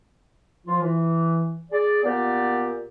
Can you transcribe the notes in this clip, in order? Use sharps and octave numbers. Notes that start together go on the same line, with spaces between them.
F3 F4
E3
G#4 D5
A#2 B3 G4 D5